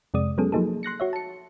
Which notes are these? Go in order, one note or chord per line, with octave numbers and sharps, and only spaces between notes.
F2 C3 G#3 D5 D#6
F#3 G#3 B3 C#4 G#4 A4
F3 F#3 A#3 D#4 G#4 A4
C6 F#6 A#6 C#7
F#4 C#5 E5
A5 C#7